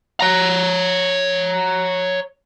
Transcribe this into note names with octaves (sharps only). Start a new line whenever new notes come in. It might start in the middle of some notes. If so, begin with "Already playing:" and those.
C#5 A#5